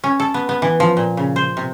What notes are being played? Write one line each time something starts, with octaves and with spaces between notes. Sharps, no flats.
C#4
A4
B3
B3
E3
F3
A#2
C#3
C5
C3